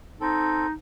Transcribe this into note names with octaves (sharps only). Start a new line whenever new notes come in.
C4 D#4 A4